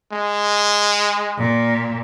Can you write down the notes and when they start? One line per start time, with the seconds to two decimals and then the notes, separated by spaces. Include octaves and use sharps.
0.12 G#3
1.38 A#2